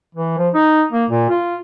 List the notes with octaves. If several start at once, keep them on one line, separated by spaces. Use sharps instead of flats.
E3
F3
D#4
A#3
A#2
F4